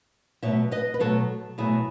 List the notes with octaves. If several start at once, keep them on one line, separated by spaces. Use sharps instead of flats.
B2 F#3 A3 C#5 E5
B4 D#5
B4
B2 F#3 A3 A4 C#5
B2 F#3 A3 E4 G#4